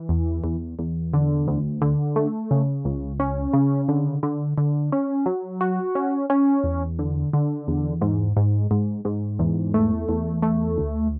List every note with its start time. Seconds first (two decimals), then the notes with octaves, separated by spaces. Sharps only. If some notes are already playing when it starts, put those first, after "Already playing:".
Already playing: E3
0.09 E2
0.44 E2
0.79 E2
1.14 D3
1.48 D2
1.82 D3
2.16 A3
2.51 C#3
2.85 C#2
3.20 C#4
3.53 C#3
3.88 D3
4.23 D3
4.58 D3
4.92 C#4
5.26 F#3
5.61 F#4
5.95 C#4
6.30 C#4
6.64 E2
6.99 D3
7.33 D3
7.68 E2
8.01 G#2
8.37 G#2
8.71 G#2
9.05 G#2
9.39 E2
9.74 A3
10.09 E2
10.42 A3
10.78 D2